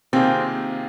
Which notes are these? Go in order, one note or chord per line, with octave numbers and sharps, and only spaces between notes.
C3 D#3 A#3 C4 F4 G#4